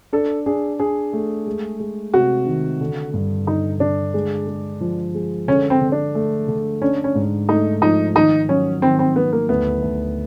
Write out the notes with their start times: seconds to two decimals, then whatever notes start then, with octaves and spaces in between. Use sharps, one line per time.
0.13 D4 A4
0.46 D4 G#4
0.79 D4 G#4
1.13 A3
1.47 G#3
1.80 G#3
2.14 C3 F#4
2.47 D#3
2.81 D3
3.14 G2
3.47 D3 D#4
3.80 D3 D4
4.14 G#3
4.47 G#3
4.81 F3
5.15 G#3
5.48 D3 C#4
5.70 C4
5.81 D3
5.92 D4
6.15 A3
6.48 D3
6.81 C#4 D4
7.04 C#4
7.15 G#2
7.48 A3 D#4
7.82 F3 D#4
8.15 D#3 D#4
8.49 F#3 C#4
8.82 D#3 C4
8.99 C4
9.16 D#3 B3
9.33 A#3
9.49 D2 B3
9.82 D2